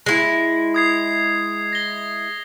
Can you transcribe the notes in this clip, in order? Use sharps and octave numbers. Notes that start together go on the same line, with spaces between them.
G#3 E4
D#6 G#6 C7
A#6 G7